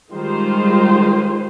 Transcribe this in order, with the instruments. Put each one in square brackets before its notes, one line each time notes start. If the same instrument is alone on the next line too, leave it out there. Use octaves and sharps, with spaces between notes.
[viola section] D#3 G3 G#3 F4 C5